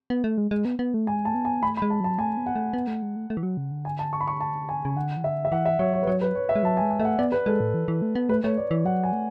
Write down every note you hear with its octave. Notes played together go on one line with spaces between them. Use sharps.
B3
A3
G#3
G#3
B3
B3
A3
G#3 G#5
A3 A5
B3
G#5
A3 B5
B5
G#3
A5
F#3 A5
A3 G#5
B3
F#5
A3
B3
A3
G#3
A3
A3
E3
F#3
C#3
D3
G#5
A5
C#6
B5
C#6
A5
G#5
C#3
D3 F#5
E3
D3 E5
E5
E3 F#5
E5
F#3 C#5
C#5
B4
F#3 C#5
B4
C#5
E5
G#3
F#3 A5
G#5
G#3
G#5
A3 E5
F#5
B3 D5
B4
G#3 A4
A2
E3
E3
A3
B3
A3 B4
A3 C#5
D5
E3
F#3 F#5
G#5
A3